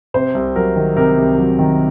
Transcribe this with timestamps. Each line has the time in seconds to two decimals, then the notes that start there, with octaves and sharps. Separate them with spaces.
0.14 C3 C5
0.35 C2
0.56 F#3 A#4
0.76 D#3
0.96 C3 A#4
1.17 C2
1.38 F#3
1.59 D#3